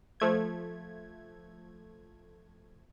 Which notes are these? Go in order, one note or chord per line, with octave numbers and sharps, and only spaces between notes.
F3 A3 G#6